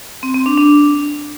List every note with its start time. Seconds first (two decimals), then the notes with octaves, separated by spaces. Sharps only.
0.23 C4
0.34 C4
0.46 D4
0.57 D4